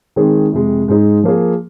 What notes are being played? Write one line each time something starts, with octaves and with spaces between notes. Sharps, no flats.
D#3 G#3 C4 D#4 G#4
F2 C3 G#3
G#2 G#3 D#4 G#4
F3 A#3 G#4